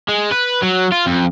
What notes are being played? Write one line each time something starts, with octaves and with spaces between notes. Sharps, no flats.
G#3
B4
F#3
F4
F2